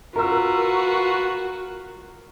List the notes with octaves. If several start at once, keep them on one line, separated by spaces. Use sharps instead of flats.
F4 F#4 A#4 B4 E6